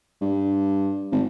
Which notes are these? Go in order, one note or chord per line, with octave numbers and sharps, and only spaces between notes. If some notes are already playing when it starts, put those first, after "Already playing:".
G2
G#1